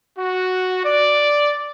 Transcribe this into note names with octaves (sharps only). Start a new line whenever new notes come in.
F#4
D5